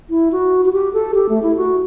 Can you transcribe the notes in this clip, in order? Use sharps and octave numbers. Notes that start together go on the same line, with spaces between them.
E4
F#4
F#4
G4
A4
G4
A3
E4
F#4